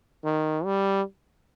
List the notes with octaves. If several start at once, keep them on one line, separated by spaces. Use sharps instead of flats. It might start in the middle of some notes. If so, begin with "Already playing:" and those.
D#3
G3